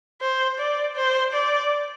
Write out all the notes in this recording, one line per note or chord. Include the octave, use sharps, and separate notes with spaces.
C5
D5
C5
D5